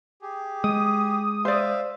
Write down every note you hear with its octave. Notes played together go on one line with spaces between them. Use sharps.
G4 G#4
G#3 D#6
C5 D5 E5 F5